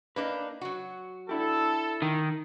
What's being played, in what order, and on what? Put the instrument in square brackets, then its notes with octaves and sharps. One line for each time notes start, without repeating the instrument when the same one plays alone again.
[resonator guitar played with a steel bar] A#3 D4 D#4 [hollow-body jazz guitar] B4
[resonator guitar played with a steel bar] F#3 F#4
[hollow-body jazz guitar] D4 E4 G4 [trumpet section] A4
[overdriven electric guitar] D#3